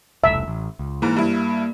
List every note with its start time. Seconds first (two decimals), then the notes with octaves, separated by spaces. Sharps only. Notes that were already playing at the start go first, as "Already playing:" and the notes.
0.24 E1 C2 A2 E5
0.48 A1
0.79 C#2
1.02 G#2 E3 A#3
1.17 G2 E4